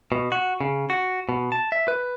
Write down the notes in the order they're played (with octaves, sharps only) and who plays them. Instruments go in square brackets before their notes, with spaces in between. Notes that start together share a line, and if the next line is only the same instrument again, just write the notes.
[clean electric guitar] B2
F#4
C#3
F#4
B2
A5
E5
B4